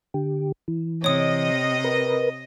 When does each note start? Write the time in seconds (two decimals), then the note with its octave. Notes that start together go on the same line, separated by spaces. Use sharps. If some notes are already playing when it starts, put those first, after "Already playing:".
0.14 D3 G4
0.68 E3
1.04 C3 C#5 D#5 D#6
1.84 A#4 B4